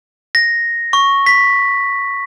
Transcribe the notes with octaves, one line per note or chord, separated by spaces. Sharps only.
A#6
C#6
B6